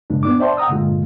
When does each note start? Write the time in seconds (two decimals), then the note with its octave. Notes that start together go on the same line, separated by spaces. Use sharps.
0.10 G2 A#2 C#3 G#3 D4
0.23 B3 D4 D6
0.40 C5 D5 E5 G5 A5 C6
0.57 F#5 G5 A#5 D#6 E6
0.69 G2 A#2 D3 G#3 F4